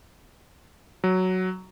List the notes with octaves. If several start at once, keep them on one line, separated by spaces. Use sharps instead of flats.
F#3